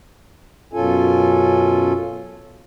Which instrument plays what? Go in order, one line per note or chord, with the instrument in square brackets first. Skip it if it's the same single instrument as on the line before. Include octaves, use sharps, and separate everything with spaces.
[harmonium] F#2 B2 C#4 F4 A4 G#5